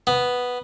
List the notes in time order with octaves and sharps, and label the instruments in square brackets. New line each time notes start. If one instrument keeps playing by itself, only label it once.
[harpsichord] B3